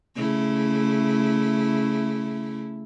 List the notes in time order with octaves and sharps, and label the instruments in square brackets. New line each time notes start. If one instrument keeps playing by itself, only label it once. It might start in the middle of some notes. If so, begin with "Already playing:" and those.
[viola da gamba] C#3 A3 E4